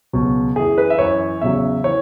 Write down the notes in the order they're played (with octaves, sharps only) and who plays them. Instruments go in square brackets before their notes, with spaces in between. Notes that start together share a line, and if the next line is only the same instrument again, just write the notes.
[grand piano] C#2 B2 F#3
F#2 E3 G#4
B4
E5
F#2 E3 C#5
E2 C#3 F#3 E5
E3 C#5